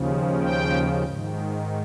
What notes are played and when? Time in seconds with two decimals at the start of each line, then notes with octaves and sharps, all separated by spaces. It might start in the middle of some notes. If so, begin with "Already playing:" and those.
Already playing: D#2 C#3 F3
0.42 G5
1.04 G#2 D#3